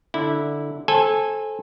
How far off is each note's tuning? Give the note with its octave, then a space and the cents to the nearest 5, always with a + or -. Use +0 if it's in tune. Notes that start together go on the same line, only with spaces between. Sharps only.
D3 +0 E4 -15
A4 -15 C5 +25 G#5 -15